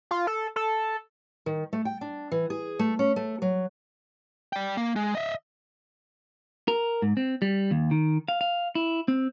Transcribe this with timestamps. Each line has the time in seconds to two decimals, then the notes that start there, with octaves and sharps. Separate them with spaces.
0.11 F4
0.27 A4
0.56 A4
1.46 D#3
1.73 A3
1.85 G5
2.01 D4
2.32 E3
2.50 G#4
2.79 A3
2.99 C#4
3.16 A3
3.42 F#3
4.53 D5 G5
4.77 A#3
4.96 G#3
5.15 D#5 E5
6.68 A#4
7.02 G#2
7.17 C4
7.42 G3
7.71 D#2
7.91 D#3
8.28 F5
8.41 F5
8.75 E4
9.08 C4